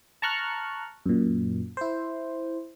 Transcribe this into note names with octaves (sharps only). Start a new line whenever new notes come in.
A5 A#5 C#6 F6 F#6
F#2 A#2
E4 C5